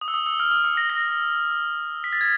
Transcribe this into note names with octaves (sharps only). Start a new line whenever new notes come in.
D#6
E6
D#6
E6
F6
D#6
E6
A#6
A#6
B6
A6
G#6